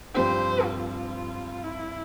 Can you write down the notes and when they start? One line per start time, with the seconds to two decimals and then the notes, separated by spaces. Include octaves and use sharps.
0.15 G2 F3 C4 G4 C5
0.64 F4
1.63 E4